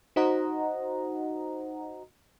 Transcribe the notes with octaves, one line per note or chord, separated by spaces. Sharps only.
D#4 F#4 C5 D#5 F#5 A#5